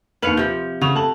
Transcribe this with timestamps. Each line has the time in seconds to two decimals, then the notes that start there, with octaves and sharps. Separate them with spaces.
0.22 D#2 B4 F5 C#7 F#7
0.37 C3 F3 G6
0.81 C#3 F#4 F7
0.95 A3 A5 F#7